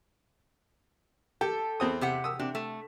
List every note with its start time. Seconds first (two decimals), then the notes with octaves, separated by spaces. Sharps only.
1.41 G4 A4
1.80 E2 C4 D#6
2.01 C3 G4 F#5
2.24 D#6 E6
2.39 C3 D4
2.55 A3